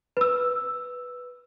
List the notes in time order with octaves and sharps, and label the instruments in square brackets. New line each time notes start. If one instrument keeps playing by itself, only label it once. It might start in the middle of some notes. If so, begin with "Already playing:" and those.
[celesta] B4 E6